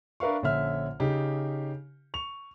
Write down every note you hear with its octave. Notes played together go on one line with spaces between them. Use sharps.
D4 A#4 B4 E5 F5 C#6
A#1 D3 C#4 E5 F6
C#3 D#4 G4
C#6 F7